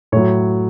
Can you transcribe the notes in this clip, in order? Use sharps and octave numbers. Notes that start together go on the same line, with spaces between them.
A2 F#3 C#5